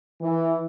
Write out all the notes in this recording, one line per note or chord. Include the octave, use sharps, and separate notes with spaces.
E3